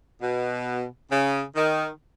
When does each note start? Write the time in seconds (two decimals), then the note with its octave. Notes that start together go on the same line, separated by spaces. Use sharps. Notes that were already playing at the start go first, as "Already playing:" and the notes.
0.21 B2
1.11 C#3
1.55 D#3